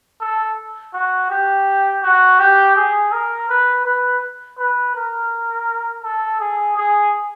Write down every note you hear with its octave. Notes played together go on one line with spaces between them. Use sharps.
A4
F#4
G4
F#4
G4
G#4
A#4
B4
B4
B4
A#4
A4
G#4
G#4